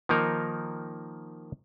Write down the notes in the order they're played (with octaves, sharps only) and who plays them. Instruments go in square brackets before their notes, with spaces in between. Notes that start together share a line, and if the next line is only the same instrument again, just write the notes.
[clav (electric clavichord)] D#3 F3 A#3 D#4 A#4